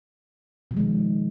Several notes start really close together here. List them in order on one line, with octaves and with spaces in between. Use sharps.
B2 F3 G#3 D#3